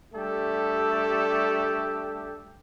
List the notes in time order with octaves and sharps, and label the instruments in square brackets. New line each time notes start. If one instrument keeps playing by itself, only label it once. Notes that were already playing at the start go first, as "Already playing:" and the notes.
[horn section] G3 A3 D4 G4 A4